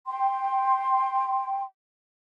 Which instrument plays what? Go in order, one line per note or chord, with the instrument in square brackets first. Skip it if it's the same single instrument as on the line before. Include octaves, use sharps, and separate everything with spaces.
[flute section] G5 C6